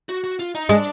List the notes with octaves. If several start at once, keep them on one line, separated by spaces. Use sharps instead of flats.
F#4
F#4
F4
D#4
G#3 D4